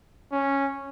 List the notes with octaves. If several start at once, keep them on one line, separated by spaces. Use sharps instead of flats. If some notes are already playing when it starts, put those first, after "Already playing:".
C#4